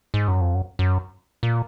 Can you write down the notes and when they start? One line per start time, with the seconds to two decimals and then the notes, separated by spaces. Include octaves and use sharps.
0.14 G#2
0.28 F#2
0.41 F2
0.55 F#2
0.79 F#2
1.43 A#2